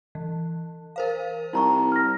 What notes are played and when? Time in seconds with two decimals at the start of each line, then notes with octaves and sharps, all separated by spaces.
0.15 E3
0.96 A#4 C5 F5
1.53 C2 D#4 G5 A#5 C#6
1.92 F6 A#6